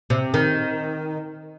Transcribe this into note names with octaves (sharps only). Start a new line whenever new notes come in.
C3
D#3